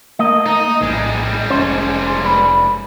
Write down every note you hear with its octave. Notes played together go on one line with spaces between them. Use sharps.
A3 A#3 D#5
D#4
A#1 A2 G3 G#3
F1 C#4 C5
B4